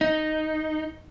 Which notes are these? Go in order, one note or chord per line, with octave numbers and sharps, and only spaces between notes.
D#4